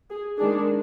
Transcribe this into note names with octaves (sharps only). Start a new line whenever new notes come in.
G#4
D#3 G#3 D4 G#4